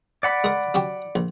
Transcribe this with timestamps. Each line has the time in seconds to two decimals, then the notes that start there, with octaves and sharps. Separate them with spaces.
0.23 D5 F#5 B5
0.44 G#3 A#4
0.74 F#3 C#4 G4
1.15 A#1